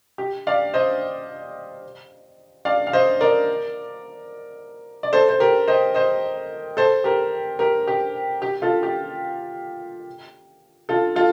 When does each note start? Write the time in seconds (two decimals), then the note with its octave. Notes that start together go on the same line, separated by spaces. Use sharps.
0.18 G4
0.47 D5 F5
0.74 C5 D#5
2.65 D5 F5
2.87 F5
2.93 C5 D#5
3.20 A#4 D5
5.03 D5
5.13 A4 C5
5.29 C5
5.40 G4 A#4
5.68 C5 D#5
5.94 C5 D#5
6.77 A4 C5
7.04 G4 A#4
7.59 G4 A#4
7.87 G4
8.42 G4
8.62 F4 A4
8.83 G4
10.89 F4 A4
11.16 F4 A4